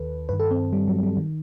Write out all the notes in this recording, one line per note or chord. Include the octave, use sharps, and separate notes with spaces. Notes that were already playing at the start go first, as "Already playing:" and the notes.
Already playing: D#2 D#3 A4 B4
G2 D#3 B4
A4
C4
G3
F#3
G3
D#3